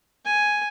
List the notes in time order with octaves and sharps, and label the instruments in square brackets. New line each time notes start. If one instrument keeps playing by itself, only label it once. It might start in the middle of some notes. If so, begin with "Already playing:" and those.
[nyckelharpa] G#5